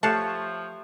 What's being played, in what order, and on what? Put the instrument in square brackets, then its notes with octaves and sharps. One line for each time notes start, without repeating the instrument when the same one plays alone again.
[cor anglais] F3 [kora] A3 G4 C#5 [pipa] F5 F#5 A5